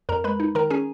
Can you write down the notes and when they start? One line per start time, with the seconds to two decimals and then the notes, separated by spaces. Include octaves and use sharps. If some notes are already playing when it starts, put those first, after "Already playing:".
0.09 F2 A#4 A#5
0.24 G#3 B4 B5
0.40 D#4
0.55 D#3 A#4 A#5
0.70 C#4 G#4 G#5